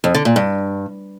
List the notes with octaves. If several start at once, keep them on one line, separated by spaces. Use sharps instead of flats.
F2
D3
A#2
G2